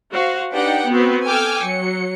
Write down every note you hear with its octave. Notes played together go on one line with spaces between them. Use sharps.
F#4 C5 F5
D4 D#4 G4 B4 F#5 G5
B3 C4 F#4 B4
A4 G5 G#5 D6 E6 F6
F#3 C#7